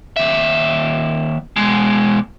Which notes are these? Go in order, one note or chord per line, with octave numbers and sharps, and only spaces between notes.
D#2 E5
B2 G#3